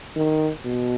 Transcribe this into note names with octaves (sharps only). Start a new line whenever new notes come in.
D#3
B2